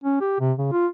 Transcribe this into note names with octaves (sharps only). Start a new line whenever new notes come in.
C#4
G4
C3
C#3
F4